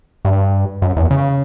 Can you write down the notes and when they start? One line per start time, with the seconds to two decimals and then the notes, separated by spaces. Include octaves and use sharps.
0.25 G2
0.82 F#2
0.96 E2
1.11 C#3